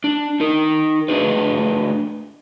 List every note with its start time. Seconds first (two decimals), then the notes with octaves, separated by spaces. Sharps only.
0.04 D4
0.40 D#4 A#4
1.08 A3 D4 G#4 B4